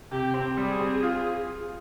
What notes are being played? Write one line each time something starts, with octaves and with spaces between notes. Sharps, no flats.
C3 G4
C4
G3 G#4
C4
F4